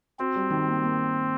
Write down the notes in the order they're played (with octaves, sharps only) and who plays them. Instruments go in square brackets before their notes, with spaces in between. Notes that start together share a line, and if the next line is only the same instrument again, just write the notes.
[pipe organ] C4 [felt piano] F#4
[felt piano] G3
D#3
A#3
A#3